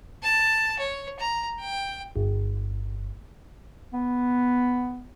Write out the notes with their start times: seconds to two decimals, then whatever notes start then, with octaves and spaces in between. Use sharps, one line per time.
0.23 A5
0.79 C#5
1.20 A#5
1.59 G5
2.16 G1
3.93 B3